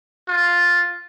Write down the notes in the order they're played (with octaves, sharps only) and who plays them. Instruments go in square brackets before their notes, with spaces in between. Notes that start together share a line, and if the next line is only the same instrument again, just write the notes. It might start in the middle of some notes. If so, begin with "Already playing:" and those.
[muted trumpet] F4